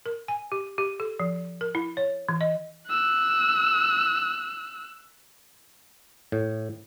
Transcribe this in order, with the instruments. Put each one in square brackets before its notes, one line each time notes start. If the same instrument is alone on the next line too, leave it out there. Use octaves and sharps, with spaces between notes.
[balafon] A#4
G#5
G4
G4
A4
F3
A#4
E4
C#5
E3
D#5
[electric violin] E6 F#6
[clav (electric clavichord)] A2